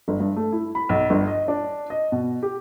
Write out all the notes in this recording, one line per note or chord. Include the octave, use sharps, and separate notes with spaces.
G1
G2
A3
E4
B5
B1
G1
D#5
D4
D#5
B2
G4